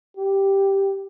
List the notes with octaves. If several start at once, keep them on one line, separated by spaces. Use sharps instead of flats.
G4